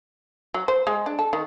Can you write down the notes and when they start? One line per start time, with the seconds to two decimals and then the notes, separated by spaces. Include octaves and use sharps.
0.54 F#3
0.68 C5
0.87 G#3
1.06 D4
1.19 A4
1.33 D#3